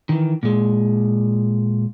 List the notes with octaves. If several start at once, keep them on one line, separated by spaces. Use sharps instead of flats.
D#3 E3
A#2 G#3